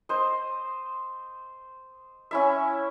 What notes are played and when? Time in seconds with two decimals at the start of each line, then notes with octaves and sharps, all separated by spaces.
0.09 C5 D#5
2.31 C#4 E4 E5